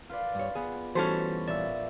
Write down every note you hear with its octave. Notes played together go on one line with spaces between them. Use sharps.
F4 B4 D5
G2 C#5
B3 G#4
E3 G3 C#4 F#4 A4 B4 C5
A#1 D5 E5